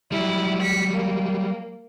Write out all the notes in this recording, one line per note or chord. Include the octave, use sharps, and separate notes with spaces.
F#3 G3 E4
B6 C#7
A#3